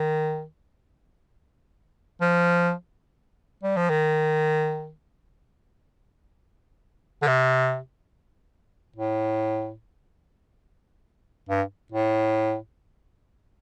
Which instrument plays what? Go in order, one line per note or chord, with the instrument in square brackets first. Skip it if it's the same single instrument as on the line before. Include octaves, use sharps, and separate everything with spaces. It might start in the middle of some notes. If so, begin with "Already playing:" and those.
Already playing: [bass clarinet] D#3
F3
G3
F3
D#3
D3
C3
A2
G2
A2